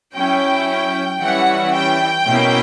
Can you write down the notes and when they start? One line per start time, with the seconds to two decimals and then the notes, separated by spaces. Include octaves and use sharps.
0.16 F#3 C#4 E4 G5
1.22 E3 G3 C#4 E4 F#5
1.74 G5
2.27 B2 A#3 C#4 E4